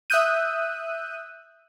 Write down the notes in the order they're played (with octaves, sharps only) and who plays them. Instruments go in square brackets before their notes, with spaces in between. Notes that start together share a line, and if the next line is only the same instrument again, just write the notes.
[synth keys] E5 D#6 E6 F#6 G6 D#7